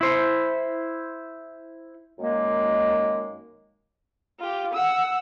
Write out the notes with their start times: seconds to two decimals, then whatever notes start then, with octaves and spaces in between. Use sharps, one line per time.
0.01 E4 C5
2.19 F#2 D#3 G#3 A#3
4.40 F4 G4
4.73 F#5 E6